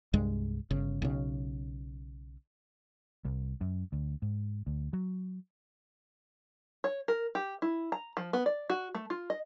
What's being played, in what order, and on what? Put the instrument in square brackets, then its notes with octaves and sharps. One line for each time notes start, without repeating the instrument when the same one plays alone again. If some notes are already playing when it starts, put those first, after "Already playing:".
[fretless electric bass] C2 G2 G#3
G1 C#3
B1 C#3
[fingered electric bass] C2
F#2
D2
G#2
D2
F#3
[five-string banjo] C#5
A#4
G4
E4
A#5
F3
B3
D5
F#4
A3
F4
D#5